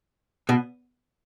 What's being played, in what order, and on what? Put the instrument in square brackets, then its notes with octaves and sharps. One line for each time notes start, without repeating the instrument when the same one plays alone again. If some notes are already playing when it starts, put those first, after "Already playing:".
[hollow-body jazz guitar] B2